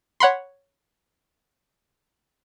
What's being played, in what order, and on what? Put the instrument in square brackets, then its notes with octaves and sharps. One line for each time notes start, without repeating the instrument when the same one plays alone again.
[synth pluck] C#5 F#5 B5 C6